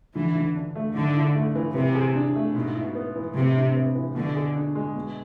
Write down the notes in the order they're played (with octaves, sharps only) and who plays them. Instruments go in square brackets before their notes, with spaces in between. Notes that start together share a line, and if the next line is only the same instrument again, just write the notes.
[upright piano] D3 [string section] E3
[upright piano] D3
D4
A3
[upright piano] G#2 [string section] D3
[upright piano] E4
A3
E3
[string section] C3 [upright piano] E3
[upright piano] G#4
D4
A3
[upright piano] G#2 [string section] B2
[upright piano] E4
B3
E3
[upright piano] A2 [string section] C3
[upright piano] D4
B3
E3
[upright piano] B2 [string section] D3
[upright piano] G#4
D4
G#3
B2